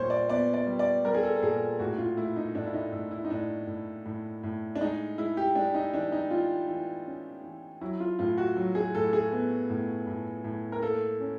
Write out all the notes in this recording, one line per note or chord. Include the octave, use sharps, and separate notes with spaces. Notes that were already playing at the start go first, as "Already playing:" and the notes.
Already playing: A#2 G3 C5 C#5
D5
B3 D5
D5
G3
D5
G3 A#4
G#4
A4
A4
A#2 G#4
A2 F#4
F4
A3 E4
D#4
A2 D4
E4
D#4
A2 E4
E4
D#4
A2 D4
A2
A2
A2
D4
G#3 D#4
G#3 E4
G4
G#3 D4
D#4
E3 D4
D#4
E3 F4
E3
C#4
E3
F#3 E4
F4
A2 F4
F#4
F#3
G#4
A2 A4
G#4
B3
A2
A2
A2
A#4
A#3 A4
C#4